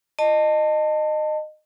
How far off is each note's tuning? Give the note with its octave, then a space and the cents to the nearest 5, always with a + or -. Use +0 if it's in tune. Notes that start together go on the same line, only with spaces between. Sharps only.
D#5 -20 A5 +20